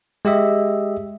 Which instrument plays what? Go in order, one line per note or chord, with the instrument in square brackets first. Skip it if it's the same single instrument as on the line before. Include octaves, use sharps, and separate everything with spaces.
[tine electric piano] G#3 G4 D#5 E5